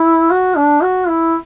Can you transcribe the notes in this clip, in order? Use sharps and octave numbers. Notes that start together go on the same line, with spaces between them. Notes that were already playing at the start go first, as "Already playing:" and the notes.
Already playing: E4
F#4
D4
F#4
E4